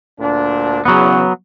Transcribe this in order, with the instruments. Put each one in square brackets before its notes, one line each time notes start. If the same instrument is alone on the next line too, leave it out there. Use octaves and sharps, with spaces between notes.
[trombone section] D2 A#2 D4
[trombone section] E2 C#3 [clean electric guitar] F#3 B3